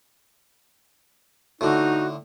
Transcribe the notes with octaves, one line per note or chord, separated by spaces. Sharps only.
A2 D3 D#4 F#4